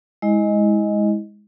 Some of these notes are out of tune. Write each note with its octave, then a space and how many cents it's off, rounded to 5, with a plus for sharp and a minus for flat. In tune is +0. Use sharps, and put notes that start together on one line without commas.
G#3 +0 E4 -30 D#5 +0